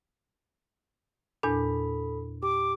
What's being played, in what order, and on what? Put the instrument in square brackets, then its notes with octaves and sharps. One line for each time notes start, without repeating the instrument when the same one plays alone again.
[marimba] E2 A#2 D4 [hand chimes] A4 B5
[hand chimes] G4 [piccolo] D6